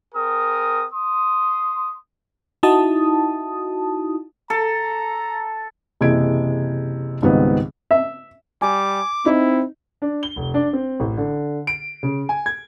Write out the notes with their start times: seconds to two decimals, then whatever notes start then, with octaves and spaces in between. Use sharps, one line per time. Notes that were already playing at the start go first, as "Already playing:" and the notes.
0.15 C4 G#4 A#4 D#6
0.94 C6 D#6
2.63 D#4 E4 F#4 A5 D#6
4.50 A4 A#5
6.01 F#1 C3 E3 G#4 G#6 D7
7.22 C#2 G#2 D#3 G3 B3 C4
7.91 E5
8.62 G3 G#5 D6
9.26 C4 D#4 E4
10.02 D4
10.23 G7
10.36 F1
10.54 D4
10.73 C4
11.00 A1
11.17 D3
11.67 D7
12.03 C#3
12.29 G#5
12.46 G#6